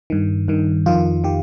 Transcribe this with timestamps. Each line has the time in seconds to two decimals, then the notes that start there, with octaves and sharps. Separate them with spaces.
0.10 G2 D#3
0.48 G2 D#3
0.86 F2 D#3 F4
1.24 D#3 G4